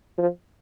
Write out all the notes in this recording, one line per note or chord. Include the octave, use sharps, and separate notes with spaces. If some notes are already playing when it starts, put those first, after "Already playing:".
F3